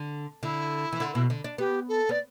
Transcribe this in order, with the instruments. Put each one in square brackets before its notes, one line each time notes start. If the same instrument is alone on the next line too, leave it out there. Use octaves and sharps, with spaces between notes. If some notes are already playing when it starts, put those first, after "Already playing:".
Already playing: [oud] D3
[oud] D3 [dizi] E4
[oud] E3
D3
B2
D3
D4
[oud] B3 [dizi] G4
[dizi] A4
[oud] B3 [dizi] D5